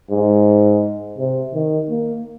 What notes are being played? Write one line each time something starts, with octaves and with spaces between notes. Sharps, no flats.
G#2
C3
D#3
A#3